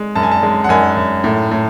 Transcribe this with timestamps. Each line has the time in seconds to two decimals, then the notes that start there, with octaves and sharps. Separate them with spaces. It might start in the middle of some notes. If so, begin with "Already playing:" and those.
Already playing: G#3
0.15 F#2 A5
0.23 G#5
0.32 A5
0.43 G#3
0.64 F#5
0.69 F#2 G#5
0.97 F#2
1.24 A2
1.51 A2